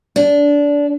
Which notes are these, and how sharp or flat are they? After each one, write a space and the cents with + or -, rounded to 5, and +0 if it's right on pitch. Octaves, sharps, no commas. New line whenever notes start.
D4 -20